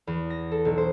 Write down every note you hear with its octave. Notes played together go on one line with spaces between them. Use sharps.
E2
A#6
A4
B1
C5